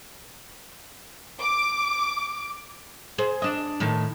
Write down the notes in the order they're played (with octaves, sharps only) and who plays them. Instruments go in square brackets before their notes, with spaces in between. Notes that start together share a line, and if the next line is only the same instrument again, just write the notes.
[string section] D6
[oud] G#4 C5
D4 D#5
A2 D#3 A4